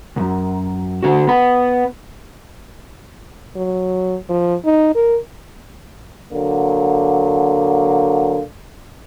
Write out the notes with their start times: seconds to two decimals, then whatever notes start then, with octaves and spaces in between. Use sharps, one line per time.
0.16 C2 F#2
1.03 D3 F#4
1.27 B3 B5
3.56 F#3
4.29 F3
4.65 D#4
4.95 A#4
6.33 D3 F#3 A#3